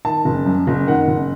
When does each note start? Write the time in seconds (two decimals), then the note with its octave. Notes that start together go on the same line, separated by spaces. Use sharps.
0.05 D#3 A5
0.25 F#1
0.46 F#2
0.67 F#1
0.87 D#3 F#5
1.08 F#1